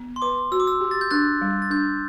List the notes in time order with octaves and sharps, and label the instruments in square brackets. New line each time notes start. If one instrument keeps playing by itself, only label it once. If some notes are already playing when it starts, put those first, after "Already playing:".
Already playing: [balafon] B3
[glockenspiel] C6
[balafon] B4 [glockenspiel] D6
[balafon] F#4 [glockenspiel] E6
[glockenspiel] D6
E6
[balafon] G4
[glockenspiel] A6
G6
[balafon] D4 [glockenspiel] F#6 A6
[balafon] G3
[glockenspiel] A6
[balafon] D4 [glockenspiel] G6